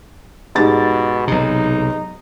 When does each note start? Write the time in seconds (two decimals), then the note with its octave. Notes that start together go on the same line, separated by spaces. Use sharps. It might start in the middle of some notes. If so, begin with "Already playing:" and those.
0.56 G#2 B2 G4 A6
1.28 B1 C3 D#4